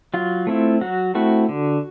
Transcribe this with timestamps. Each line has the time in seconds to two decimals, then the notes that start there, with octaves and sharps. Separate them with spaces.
0.14 F#3 F4
0.47 A3 C4 E4
0.81 F#3 F#4
1.15 A3 C4 E4 F#4
1.49 D3